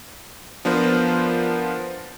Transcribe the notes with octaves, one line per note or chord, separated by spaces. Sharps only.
F3 B3 D4 F4 A#4 C5